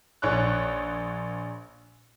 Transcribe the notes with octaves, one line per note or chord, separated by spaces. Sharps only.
A#1 C#5 F#6